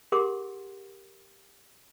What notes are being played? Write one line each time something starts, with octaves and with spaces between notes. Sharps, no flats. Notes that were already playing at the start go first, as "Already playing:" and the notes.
G4 G#4 A#4 F#5 C6 D6